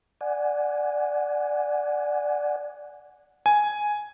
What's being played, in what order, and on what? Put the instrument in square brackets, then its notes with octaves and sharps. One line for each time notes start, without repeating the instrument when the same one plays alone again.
[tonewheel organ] D5 F#5 G#5
[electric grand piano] G#5